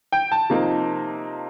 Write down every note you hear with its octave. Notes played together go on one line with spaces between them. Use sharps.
G5
A5
C3 F3 A#3 D#4